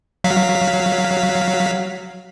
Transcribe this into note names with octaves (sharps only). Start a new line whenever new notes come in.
F#3 F5 B6